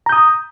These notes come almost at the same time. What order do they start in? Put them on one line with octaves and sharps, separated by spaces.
A#5 G6 D#6